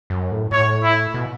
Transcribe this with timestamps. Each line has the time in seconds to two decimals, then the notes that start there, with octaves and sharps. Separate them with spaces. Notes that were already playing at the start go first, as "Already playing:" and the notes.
0.10 F#2
0.32 A2
0.51 A2 C#5
0.83 E4
1.14 B2